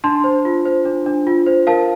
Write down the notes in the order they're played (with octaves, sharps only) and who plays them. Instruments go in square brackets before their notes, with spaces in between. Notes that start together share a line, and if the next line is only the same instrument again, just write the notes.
[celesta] D4 A5 C6
C5
F4
C5
D4
D4
F4
C5
A#4 F5 A5